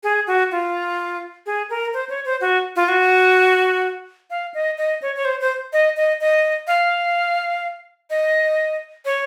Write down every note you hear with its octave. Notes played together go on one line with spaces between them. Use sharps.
G#4
F#4
F4
G#4
A#4
C5
C#5
C5
F#4
F4
F#4
F5
D#5
D#5
C#5
C#5
C5
C5
D#5
D#5
D#5
F5
D#5
C#5